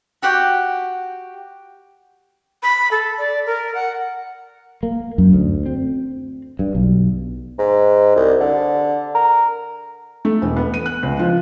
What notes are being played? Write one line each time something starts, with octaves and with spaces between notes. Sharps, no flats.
F#4 G4 F#5 G5
B5
A4
D5
A#4
F#5
A#3
F#2
D2
C4
G2
B1
G#2
C2
D3
A#4
A3
E1
B3
D#7
F#6
C#2
F3